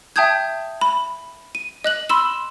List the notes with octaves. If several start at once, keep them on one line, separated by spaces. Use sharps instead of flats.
E5 G5 A5 D#6 G6 G#6
B5
D#7
D#5 F#6 F#7
B5 C6 E6 E7